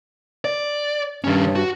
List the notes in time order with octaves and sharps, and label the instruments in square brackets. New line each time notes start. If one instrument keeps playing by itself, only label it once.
[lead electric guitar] D5
[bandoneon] G2 [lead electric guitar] D#3 C#4
[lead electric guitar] F#4